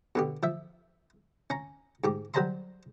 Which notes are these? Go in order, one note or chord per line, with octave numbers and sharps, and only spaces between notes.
B2 D3 G4
F3 E5
C#4 A#5
G#2 G4 D6
F#3 G3 C5 A5 A#5 C6